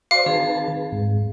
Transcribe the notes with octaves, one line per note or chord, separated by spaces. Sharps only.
F#4 C5 D5 F5 G#5 C6
D#3 C4 G#4 B4 A5
G#2